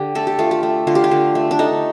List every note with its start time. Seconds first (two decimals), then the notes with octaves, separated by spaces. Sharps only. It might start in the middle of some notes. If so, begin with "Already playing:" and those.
Already playing: D3 G4
0.15 A3 A4
0.27 G4
0.39 A3 F4
0.51 G4
0.63 A3
0.87 D3 F4
0.95 G4
1.04 F4
1.11 D3
1.35 A3
1.51 D4
1.59 A3 D#4